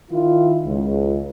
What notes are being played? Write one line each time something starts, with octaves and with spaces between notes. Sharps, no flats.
D#3 E4 F4
C#2